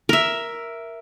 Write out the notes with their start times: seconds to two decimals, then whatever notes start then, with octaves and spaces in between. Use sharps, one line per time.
0.09 A#4 E5